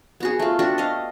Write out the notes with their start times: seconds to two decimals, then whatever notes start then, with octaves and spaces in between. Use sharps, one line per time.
0.20 B3 F#4 G#4
0.39 A3 F4
0.59 D4 F#4 G4 A4
0.78 D#5 F5